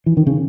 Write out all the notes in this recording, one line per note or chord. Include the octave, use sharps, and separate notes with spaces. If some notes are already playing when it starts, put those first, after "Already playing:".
E3
D#3
C#3